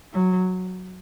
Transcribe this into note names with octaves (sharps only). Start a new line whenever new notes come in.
F#3